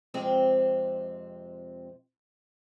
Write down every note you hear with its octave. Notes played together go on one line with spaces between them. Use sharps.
F2 C3 G#3 C4